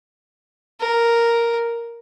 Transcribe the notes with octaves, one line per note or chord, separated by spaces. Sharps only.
A#4